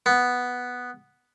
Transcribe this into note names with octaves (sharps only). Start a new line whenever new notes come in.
B3